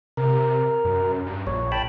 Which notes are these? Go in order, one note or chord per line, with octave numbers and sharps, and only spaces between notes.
C3 A#4
F#2
G2
A#1 C#5
G5 A5 B5